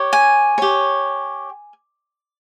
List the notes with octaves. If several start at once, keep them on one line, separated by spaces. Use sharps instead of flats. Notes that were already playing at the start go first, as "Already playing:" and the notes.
Already playing: G4 C#5
G#5
G4 C#5